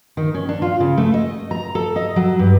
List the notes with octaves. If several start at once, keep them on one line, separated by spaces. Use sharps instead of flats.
D#3
C#4
D4
F4
C#3
A3
D#5
A#5
A4
D#5
F#3
G2